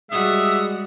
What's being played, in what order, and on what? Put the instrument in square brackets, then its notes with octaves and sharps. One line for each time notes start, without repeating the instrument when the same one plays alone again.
[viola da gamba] G3 F#4 [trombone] G#3 [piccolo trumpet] E5 [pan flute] D#6